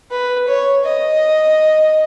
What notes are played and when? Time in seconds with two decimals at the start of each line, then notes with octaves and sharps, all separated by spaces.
0.11 B4
0.48 C#5
0.86 D#5